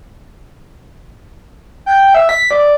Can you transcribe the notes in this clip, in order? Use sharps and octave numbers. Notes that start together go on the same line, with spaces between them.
G5
E5
B6
D5